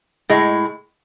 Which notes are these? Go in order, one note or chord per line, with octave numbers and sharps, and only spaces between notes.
A2 G#3